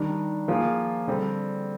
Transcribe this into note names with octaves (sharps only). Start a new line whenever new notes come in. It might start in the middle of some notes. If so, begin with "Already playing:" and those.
Already playing: D#3 G3 D4
F3 A#3 F4 G#4
D3 G3 C4